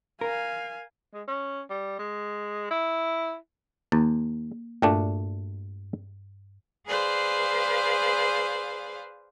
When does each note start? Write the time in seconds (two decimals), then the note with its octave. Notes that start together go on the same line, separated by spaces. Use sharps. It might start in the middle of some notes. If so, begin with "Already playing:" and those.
0.21 A#4 F5 G#5
1.14 G#3
1.28 C#4
1.70 G3
1.99 G#3
2.71 E4
3.92 D#2 A#3
4.82 G2 A#2 A3 D4
6.87 G#4 B4 C5 D5 F5